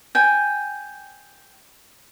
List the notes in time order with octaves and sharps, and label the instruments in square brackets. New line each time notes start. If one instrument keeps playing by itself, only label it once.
[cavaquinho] G5 G#5